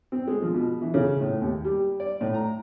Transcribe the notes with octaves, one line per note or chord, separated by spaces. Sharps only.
C4
G#3
F3
B2
E3
C#3
A2
D#2
G3
D5
A2
A#5